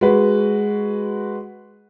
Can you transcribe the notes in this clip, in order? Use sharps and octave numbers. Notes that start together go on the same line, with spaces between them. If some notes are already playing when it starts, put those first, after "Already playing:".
G#3 F#4 B4